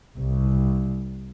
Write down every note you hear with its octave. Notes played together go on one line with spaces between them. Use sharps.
C2